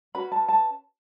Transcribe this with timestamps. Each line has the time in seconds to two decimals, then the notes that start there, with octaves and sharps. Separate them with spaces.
0.15 C#4 F#4 B4 B5
0.32 A5
0.49 A5